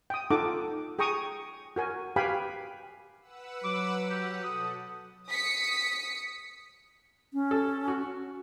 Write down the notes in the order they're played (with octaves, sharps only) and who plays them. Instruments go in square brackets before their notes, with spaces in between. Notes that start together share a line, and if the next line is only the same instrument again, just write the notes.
[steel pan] G5 D#6
D#4 F4 A4 F#5 D6
G#4 G5 A#5 C#6 D#6
F#4 A#4 G#5
G4 B4 F5 G5 G#5 B5
[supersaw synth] B4 F#5 E6
[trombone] F#3 [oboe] D6
[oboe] G4 [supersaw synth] F#5
[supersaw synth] B2 A4 [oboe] D#6
[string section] D#6 B6 C#7
[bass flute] C#4
[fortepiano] A4
F#4